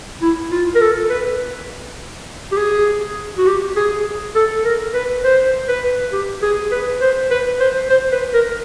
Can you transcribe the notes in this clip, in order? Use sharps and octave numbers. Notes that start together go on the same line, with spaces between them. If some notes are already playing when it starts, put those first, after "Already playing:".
E4
F4
A#4
A4
B4
G4
G#4
F#4
G4
G#4
A4
A#4
B4
C5
B4
G4
G#4
B4
C5
B4
C5
C5
B4
A#4